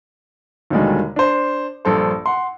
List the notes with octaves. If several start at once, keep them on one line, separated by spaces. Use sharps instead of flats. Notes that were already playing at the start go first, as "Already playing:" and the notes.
D#2 B2 D3 D#3 G3 G#3
D4 C5
A#1 G2 A4 C5
F#5 C6